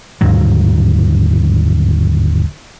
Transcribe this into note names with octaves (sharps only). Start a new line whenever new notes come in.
G1 D#2 G#2 F#3